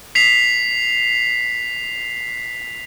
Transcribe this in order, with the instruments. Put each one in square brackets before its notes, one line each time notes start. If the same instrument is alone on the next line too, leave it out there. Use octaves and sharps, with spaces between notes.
[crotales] B6 C7 F7